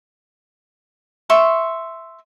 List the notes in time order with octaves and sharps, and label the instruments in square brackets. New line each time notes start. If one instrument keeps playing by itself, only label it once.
[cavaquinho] E5 C6 C#6